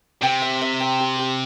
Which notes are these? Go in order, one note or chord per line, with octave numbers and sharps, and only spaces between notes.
C3 G5
E5
E5
G5
G4
G4